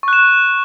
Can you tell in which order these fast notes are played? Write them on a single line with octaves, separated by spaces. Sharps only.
C#6 F#6 E7